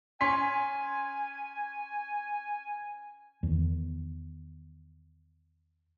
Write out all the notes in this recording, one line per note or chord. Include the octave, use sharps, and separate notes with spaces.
C#4 G#5 C6 B6
E2 D#3